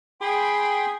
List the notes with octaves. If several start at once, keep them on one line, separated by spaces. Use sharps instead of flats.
G#4 G5 B5 C6